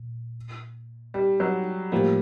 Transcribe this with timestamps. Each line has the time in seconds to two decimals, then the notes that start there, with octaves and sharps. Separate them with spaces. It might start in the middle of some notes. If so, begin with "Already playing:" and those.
Already playing: A#2
1.14 G3
1.40 F#3
1.92 A2 F3 G3 A#3